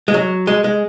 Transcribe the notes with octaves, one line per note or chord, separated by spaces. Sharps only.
G#3
F#3
G#3
G#3